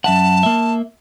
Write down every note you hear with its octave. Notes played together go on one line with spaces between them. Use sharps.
F#2 E5 F#5 A5
A#3 E5